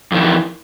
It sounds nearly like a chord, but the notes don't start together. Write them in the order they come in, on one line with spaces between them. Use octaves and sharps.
F2 D#3 E3